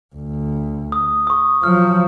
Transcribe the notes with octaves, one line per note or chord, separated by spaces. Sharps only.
D2
D#6
C#6 D#6
F3 F#3 F6